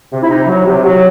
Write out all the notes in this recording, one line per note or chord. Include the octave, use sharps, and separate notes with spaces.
C3
E4
C3 D#4
F#3
C3
F#3